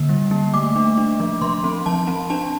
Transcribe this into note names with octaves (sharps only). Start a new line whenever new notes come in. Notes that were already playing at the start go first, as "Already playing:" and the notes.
Already playing: D3 A#3
G3
A#3
A3 D6
D4
D4
F3
F3 C6
C4
F3 A5
C4
D4 A5